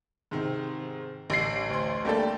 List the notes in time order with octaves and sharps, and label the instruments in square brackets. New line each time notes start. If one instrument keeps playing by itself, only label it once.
[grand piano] G#2 C3 D#3
[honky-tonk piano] A1 C7 [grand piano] D3
[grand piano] D2 C6
[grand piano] G3 A3 D4 [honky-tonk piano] A#3 G4 A4